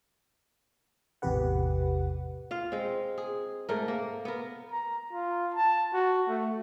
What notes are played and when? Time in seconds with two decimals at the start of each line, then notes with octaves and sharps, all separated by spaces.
1.22 A1 E2 C3 G4 B4 F#5
2.51 F4 F5
2.72 G#3 C4
3.18 G#4
3.69 G#2 A3 A#4
3.88 A#3
4.25 B3 A#4
4.71 A#5
5.13 F4
5.54 A5
5.93 F#4
6.28 A3